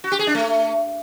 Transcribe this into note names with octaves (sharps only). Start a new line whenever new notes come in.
F#4
G4
G#4
D4
A3